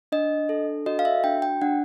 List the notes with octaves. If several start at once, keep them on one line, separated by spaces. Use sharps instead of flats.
D4 D#5
A4
F#4 D#5
F5
E5
D4 G5
G5
D4 F#5